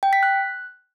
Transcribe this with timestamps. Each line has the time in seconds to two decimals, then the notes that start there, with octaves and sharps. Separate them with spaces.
0.03 G5
0.13 B6
0.23 F#6